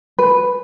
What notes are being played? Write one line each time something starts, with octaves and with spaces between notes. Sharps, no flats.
B4